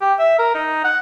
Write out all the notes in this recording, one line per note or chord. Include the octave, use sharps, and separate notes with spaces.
G4
E5
A#4
D#4
F#5